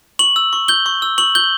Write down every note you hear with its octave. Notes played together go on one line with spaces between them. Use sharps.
C#6 F#7
E6
C#6
G6 G7
C#6
E6
C#6 F#7
G6 G7